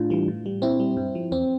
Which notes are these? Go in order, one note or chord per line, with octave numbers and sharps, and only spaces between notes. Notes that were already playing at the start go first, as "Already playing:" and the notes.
Already playing: A2 D4 F4
E3 G3
A2
G3
A#2 C4 E4
G3
G2
F3
E2 C4